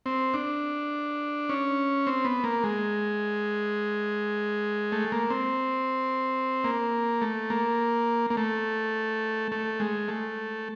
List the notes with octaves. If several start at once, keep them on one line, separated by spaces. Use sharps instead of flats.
C4
D4
C#4
C4
B3
A#3
G#3
A3
A#3
C4
A#3
A3
A#3
A#3
A3
A3
G#3
A3